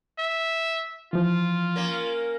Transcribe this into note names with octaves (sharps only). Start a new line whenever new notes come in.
E5
E3 F3 F4
A#3 C#4